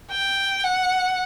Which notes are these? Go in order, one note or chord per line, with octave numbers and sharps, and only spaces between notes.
G5
F#5